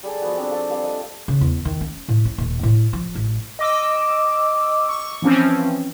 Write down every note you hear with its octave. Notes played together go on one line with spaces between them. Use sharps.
G3 G#4 A4
F3 B3 F#4
C4 D4
F4 A4
G3 C4 F5
A3 D#5
C#3
E2
D#3
C#4
A2
C#4
D#1
A2
F3
A1
D#5 D6 E6
C#6
E3 F3 C4 C#4